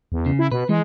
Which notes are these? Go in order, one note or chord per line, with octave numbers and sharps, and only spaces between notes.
E2
C#3
E4
B2 B4
E3 G#3